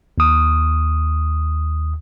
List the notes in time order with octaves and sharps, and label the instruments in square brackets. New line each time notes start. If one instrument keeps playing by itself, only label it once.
[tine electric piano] D#2 D#6